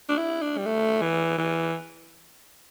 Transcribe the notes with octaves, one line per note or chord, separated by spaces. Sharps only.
D4
E4
D4
G3
A3
E3
E3